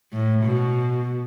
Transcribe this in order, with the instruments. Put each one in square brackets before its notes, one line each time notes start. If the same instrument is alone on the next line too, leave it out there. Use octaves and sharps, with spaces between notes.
[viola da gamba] A2
B2